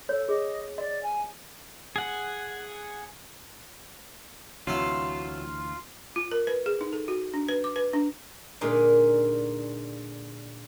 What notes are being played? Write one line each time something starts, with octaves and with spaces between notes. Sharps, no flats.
A4 C#5
G#4 D#5
D5 D#5
G#5
G#4 F#5
D2 C3 E3 F#3 A3 F4 A4
F4
A#4
B4
G#4
D#4
A4
F#4
D4
B4
D6
B4
D4
A#2 D3 G#3 D#4